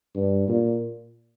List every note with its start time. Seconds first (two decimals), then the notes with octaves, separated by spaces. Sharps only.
0.16 G2
0.48 A#2